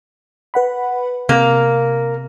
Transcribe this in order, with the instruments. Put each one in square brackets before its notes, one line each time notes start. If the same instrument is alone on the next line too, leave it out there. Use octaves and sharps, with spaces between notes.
[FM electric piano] B4 F#5 B5
[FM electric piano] C3 [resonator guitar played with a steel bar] A#3